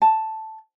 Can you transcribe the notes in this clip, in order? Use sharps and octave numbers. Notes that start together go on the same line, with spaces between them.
A5